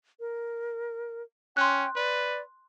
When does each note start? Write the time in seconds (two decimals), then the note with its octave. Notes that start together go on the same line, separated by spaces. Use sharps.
0.20 A#4
1.57 C#4 G5 C6 F#6
1.96 B4 D5